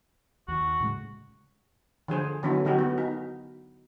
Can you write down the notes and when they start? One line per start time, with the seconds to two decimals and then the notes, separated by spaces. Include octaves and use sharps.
0.48 D#2 D#3 F#4
0.80 A2 C#3 G#3
2.08 D3 F3 G#4 C5
2.43 D3 F#3 B3 C#4 D#4 E4
2.65 D3 F#3 D#4 F#4 G4
2.79 B3
2.98 D#4